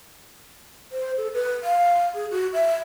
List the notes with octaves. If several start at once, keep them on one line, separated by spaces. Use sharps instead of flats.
C5
A4
B4
F5
G#4
F#4
E5